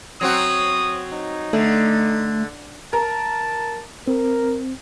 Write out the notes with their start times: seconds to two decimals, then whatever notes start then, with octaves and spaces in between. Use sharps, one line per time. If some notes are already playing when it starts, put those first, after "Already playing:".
0.21 F#3 C4 F#4 D#6
1.13 D#4
1.53 D3 A3
2.93 A#4 A5
4.08 C4 A#4